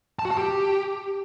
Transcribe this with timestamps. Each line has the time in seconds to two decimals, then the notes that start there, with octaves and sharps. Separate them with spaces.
0.19 A5
0.25 F#4
0.31 A5
0.37 G4